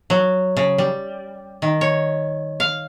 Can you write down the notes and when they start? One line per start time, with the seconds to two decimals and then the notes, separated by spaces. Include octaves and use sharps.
0.10 F#3
0.57 C#3
0.78 G3
1.62 D#3
1.81 C#5
2.60 F5